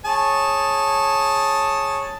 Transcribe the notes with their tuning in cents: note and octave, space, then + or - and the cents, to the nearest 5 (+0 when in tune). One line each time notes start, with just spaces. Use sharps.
G#4 +0 C#5 -10 A5 +0